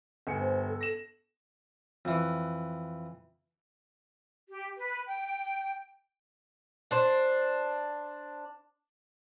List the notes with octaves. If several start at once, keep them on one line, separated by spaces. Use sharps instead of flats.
G1 G#5 C#7
C5
A4
A#6 E7
F2 E3
G4
B4
G5
D4 C5